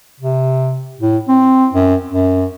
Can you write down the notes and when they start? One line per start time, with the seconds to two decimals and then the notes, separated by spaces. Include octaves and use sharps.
0.20 C3
0.99 A2
1.28 C4
1.73 F#2
2.08 F#2